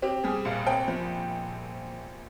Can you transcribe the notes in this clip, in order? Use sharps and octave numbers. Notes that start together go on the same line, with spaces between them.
C4 G4
G3 G#4
A#1 F5
C4 G5
F3